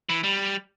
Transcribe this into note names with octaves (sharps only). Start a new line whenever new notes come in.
E3
G3